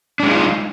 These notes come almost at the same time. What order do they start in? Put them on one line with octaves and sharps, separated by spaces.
D4 G#3 D#4 F4